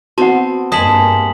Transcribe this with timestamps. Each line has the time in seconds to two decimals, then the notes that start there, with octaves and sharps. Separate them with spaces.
0.18 B3 C4 F#4 F#5 A5
0.72 G2 G#3 A#3 G#4 A5 D#6 B6 F#7